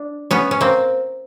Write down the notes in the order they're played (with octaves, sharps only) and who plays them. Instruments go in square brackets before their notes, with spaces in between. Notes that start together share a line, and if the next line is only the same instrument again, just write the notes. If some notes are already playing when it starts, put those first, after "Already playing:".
Already playing: [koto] D4
B3 C#4
C#4
A#3 C4